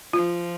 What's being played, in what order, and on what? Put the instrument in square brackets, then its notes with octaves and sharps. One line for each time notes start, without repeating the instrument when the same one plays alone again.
[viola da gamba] F3 [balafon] F4